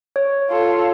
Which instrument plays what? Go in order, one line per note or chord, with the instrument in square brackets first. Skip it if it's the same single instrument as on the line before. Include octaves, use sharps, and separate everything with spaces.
[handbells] C#5
[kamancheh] F4 A4